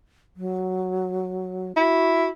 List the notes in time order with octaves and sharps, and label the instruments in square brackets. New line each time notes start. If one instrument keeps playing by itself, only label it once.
[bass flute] F#3
[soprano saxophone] E4 [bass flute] F#4